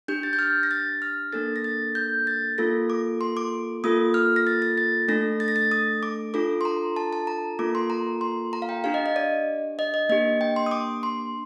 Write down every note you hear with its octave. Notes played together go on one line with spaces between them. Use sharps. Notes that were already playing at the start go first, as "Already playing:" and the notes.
D4 G4 G6
A6
G6
F6
A#6
A6
F6
A#3 D4 A4 A6
A#6
A6
G6
A6
A#3 F4 A4 A#6
D6
C6
D6
A#3 F4 A4 D#6
F6
A#6
A6
A#6
A6
A3 D4 A4 A#6
A6
A#6
A6
D#6
D6
D4 F4 A4 D6
C6
A#5
A5
A5
A#5
A#3 F4 A4 D6
C6
A#5
C6
A#5
F5
G5
D4 G4 F5
D#5
D#5
D5
D#5
D#5
A#3 D4 G4 D#5
G5
C6
D#6
D6
C6